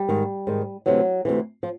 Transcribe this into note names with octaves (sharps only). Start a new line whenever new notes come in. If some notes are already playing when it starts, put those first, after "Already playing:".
Already playing: G3
G#2 D#3
G#2 D#3
D2 C3 E3 F#3
D2 C3 E3
F3